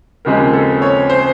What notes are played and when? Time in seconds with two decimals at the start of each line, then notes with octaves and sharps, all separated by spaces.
0.25 D#2 C#3 F3 G#3 C4 A#4
0.53 A4
0.82 C#5
1.10 C5